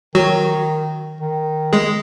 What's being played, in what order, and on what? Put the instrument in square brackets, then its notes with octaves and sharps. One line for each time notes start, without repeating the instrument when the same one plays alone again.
[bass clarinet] D#3 [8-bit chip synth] F#3 F#4
[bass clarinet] D#3
[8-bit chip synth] G#3 G#4